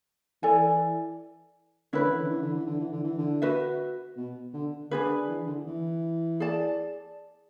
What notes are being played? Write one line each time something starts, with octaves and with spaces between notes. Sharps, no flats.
E3 A4 D5 G#5
D3 C#4 E4 B4
E3
D3
E3
D3
E3
D3
E3
D3
E3
D3
F#4 B4 E5
B2
D3
D3 D4 G#4 B4
E3
D3
E3
G#4 D5 A5